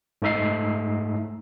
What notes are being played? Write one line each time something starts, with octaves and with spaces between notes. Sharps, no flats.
G#2 A3 D#4 E5 C7